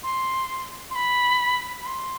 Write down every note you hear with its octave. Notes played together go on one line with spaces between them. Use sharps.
C6
C6
B5
B5
C6